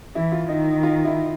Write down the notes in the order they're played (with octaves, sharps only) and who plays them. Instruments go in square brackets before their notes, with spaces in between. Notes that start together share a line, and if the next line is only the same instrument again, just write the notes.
[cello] E3 [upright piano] E4
[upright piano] F4
[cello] D#3 [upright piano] D#4
[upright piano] F4
E4